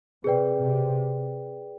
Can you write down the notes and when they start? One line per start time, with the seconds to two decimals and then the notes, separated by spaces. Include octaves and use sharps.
0.24 C3 G#4 B4 D5 G5
0.60 C3